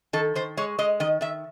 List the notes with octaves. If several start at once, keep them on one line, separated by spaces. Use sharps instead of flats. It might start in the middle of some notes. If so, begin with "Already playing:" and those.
D#3 A4
D#3 C5
G#3 C#5
G#3 D#5
D#3 D#5
D#3 E5